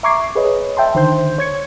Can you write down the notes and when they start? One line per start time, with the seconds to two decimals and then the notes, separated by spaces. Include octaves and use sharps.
0.03 E5 A#5 C#6 D6 G#6 C7
0.35 G#4 B4 C#5 D#5
0.77 E5 G5 A5 C6
0.95 D3 D#3 C5 C6 G6
1.38 C#5 G#6 C#7